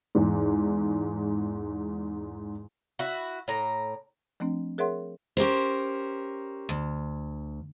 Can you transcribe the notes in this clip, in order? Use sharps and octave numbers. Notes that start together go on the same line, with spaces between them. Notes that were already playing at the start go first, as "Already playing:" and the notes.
E2 G#2
E4 F#4
A2 A#5
F3 A3 C4 D4
G#4 A#4 C#5 E5 F#5 C6
C#4 G4 A#4 C5
D2